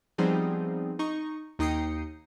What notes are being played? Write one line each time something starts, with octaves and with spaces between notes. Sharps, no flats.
F3 G3 B3 C4 D#4 G#4
D#4 C#6
D#2 D#4 G5 D#6 C7 C#7